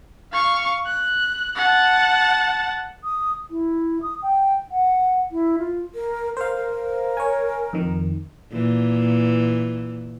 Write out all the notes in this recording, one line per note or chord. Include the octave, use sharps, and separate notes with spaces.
F5 C#6
F#6
F#5 A5
D#6
E4
D#6
G5
F#5
E4
F4
A#4
A#4 C5 F5
A#4
C#5 G#5
F2 D#3
A#2 E3